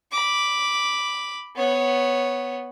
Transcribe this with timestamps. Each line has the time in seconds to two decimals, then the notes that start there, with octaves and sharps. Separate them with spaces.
0.12 B5 D6
1.56 B3 C#5